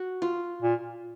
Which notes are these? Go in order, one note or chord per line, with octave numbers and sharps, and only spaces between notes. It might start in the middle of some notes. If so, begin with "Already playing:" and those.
Already playing: F#4
F4
A#2